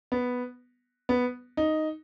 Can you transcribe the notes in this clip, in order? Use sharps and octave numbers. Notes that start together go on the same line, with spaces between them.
B3
B3
D#4